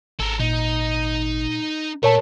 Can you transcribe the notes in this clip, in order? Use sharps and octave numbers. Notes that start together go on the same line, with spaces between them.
G#1 A4 A#4
A#2 D#4
A#2 A3 A#4 C#5 A5